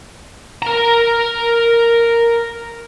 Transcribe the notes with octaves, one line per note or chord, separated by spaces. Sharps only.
A#4 A#5